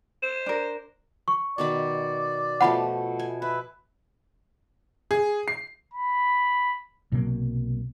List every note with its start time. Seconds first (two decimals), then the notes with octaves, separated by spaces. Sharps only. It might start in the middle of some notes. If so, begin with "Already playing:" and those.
0.22 C5
0.46 D4 A#4
1.28 C#6
1.58 B2 D#3 D5 B5
2.61 B2 F3 A3 F#5 B5
3.19 G#5
3.42 B4 E5
5.11 G#4
5.48 C7
5.93 B5
7.12 B1 C3 F#3 A#3